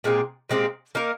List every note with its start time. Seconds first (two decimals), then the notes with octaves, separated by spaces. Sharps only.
0.04 A#2 G#3 C4 G4
0.49 A#2 G#3 C4 G4
0.95 A#3 D#4 A#4